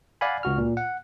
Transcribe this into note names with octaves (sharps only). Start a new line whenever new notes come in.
D5 F5 F#5 G#5 B5
C#2 F#4 F6
A#2
F#5